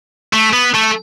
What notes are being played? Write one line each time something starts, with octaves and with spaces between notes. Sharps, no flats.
A3
B3
A3